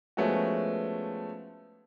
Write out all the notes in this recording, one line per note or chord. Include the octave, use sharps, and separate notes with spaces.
F3 G#3 A3 B3 C#4 F#4